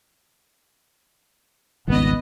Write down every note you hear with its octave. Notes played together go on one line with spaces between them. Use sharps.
D#1 G#1 C#2 B3 D#5